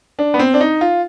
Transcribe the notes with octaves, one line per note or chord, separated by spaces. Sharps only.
D4
B3
C4
D4
D#4
F4